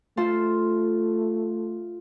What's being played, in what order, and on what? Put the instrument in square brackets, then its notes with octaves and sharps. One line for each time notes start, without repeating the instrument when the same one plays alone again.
[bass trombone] A3 [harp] F4 A4 C5